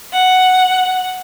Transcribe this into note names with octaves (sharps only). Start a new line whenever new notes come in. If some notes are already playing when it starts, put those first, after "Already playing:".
F#5